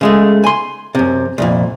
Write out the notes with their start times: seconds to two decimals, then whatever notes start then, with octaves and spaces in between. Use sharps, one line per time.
0.01 C#3 G#3 A3
0.44 G#5 C6
0.95 F#2 C3
1.38 C2 F2 A#2